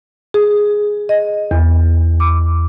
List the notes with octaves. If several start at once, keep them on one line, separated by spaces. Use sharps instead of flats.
G#4
D#5
E2
D6